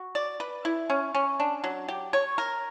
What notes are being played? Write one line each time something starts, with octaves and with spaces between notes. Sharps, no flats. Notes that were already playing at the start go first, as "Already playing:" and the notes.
Already playing: F#4
D5
B4
E4
C#4
C#4
D4
F#3
G4
C#5
A#4